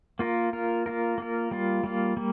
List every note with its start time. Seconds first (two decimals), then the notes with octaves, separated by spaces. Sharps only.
0.19 A#3 F4 A#4
0.53 A#3 F4 A#4
0.86 A#3 F4 A#4
1.18 A#3 F4 A#4
1.51 G3 A#3 F4
1.84 G3 A#3 F4
2.17 G3 A#3